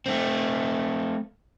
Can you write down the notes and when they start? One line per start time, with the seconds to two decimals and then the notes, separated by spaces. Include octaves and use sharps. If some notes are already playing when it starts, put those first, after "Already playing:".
0.06 A3 C4